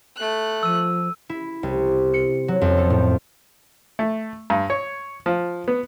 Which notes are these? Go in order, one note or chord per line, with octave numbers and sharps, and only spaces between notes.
A3 F#6
F3 E6 D#7
E4
C2
C#7
F#3
F2
A4
A2
A3
G2
C#5
F3
B3